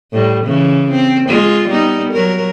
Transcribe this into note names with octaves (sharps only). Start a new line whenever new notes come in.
A2 G3
C#3 E3
C4
G#3 F4
G3 B3 D#4
F#3 A#4